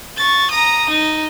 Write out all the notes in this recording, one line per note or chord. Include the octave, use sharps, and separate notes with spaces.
C#6 A6
A#5 D#6
D#4